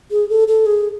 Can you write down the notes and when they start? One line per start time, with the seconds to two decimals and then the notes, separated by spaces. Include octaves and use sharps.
0.11 G#4
0.30 A4
0.48 A4
0.66 G#4